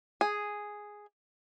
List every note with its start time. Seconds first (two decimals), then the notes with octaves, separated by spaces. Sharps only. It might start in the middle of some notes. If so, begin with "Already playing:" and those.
0.21 G#4